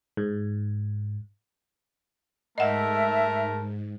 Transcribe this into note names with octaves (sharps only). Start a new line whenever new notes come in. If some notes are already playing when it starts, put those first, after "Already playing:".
G#2
G#2 A3 A4 A#4 D#5 E5 F#5